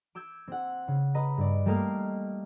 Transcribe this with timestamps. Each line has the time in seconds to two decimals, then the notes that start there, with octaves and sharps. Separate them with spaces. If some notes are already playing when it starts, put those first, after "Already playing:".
0.15 D6 E6 G6 G#6
0.48 C4 F#5
0.88 C#3
1.14 B4 D#5 A#5
1.38 G2 D5
1.66 G3 A3 A#3 A#4 D#5 F5